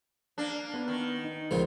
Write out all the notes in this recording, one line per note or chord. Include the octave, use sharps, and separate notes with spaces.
A#3 D4
B3 B4
D#3
D#4
C#2 A#2 C#3 F3 G#3